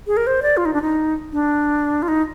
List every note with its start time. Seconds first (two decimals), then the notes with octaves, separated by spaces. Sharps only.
0.07 G#4
0.17 A#4
0.27 C5
0.42 D5
0.57 F4
0.65 D#4
0.74 D4
0.82 D#4
1.33 D4
2.02 F4
2.08 D#4